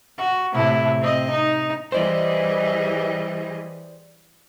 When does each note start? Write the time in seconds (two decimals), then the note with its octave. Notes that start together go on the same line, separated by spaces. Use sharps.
0.18 F#4
0.53 A2 C3 E4
1.01 C4 D#5
1.31 D#4
1.92 E3 G3 G#4 C5 D5 D#5